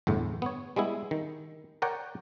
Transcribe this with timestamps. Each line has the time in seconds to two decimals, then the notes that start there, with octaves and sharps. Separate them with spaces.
0.07 G1 E2 A2
0.42 B3 C#5
0.76 G3 G#3 B3 E4
1.11 D#3
1.82 A#4 C#5 D5 F#5 G5